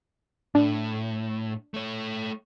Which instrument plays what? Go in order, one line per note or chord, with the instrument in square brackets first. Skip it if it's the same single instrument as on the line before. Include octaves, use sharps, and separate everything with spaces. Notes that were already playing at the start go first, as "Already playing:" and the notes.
[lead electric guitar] A2 [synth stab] D4
[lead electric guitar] A3 C#5